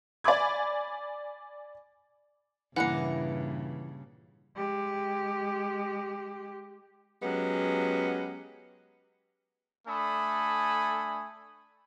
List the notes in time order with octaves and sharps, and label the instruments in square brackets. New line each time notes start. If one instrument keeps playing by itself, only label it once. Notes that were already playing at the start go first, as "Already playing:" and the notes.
[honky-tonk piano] D5 G#5 B5 D6 G#6
[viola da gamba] G2 A#2 C#3 [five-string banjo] E3 A#3 [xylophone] F#5 F#6 C#7
[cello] G#3 G4
[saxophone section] F#3 G#3 B3 C#4 G4
[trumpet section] A3 D4 A4 G#5 B5 D#6